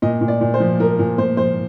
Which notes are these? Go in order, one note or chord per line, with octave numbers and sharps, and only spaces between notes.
A#2 D#5
A#2
D5
A#2
C5
F3
F3 A#4
A#2
A#2 C5
F3 C5